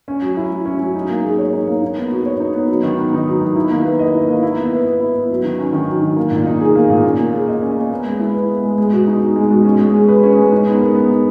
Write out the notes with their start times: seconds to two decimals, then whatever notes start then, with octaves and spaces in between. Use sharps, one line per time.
0.08 C#4
0.22 F#3
0.37 E4
0.51 F#3
0.65 C#4
0.81 F#3
0.95 D#4
1.09 A#3
1.24 G#4
1.38 C#5
1.53 D#4
1.67 A#3
1.82 D#4
1.96 B3
2.11 F#4
2.26 C#5
2.40 D#4
2.54 B3
2.68 F#3
2.83 D#3
2.98 B3
3.13 D#4
3.27 F#3
3.42 D#3
3.56 E4
3.71 A#3
3.85 B4
3.99 D#5
4.14 E4
4.28 A#3
4.43 E4
4.58 B3
4.73 B4
4.86 B3
5.01 E4
5.15 B3
5.31 F#3
5.44 D#3
5.59 C#4
5.73 D#3
5.88 F#3
6.02 D#3
6.16 A#3
6.31 A#2
6.46 D#4
6.61 G#4
6.75 A#3
6.89 A#2
7.04 C#4
7.19 A#3
7.33 G#4
7.48 D#5
7.62 C#4
7.77 A#3
7.90 B3
8.05 G#3
8.20 E4
8.34 B4
8.49 B3
8.63 G#3
8.78 G#3
8.92 B2
9.07 D#4
9.22 B2
9.36 G#3
9.51 B2
9.65 C#4
9.80 G#3
9.94 G#4
10.08 B4
10.23 C#4
10.37 G#3
10.52 D#4
10.67 B3
10.81 A#4
10.95 B3
11.10 D#4